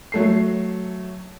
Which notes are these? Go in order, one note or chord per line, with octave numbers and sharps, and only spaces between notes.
F#3 A3 C7